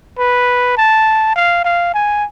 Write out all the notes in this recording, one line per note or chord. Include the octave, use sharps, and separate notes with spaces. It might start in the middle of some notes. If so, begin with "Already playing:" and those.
B4
A5
F5
F5
G#5